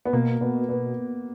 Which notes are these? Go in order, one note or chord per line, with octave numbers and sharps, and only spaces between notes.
B3
B2 A#3
B2 B3
B2 B3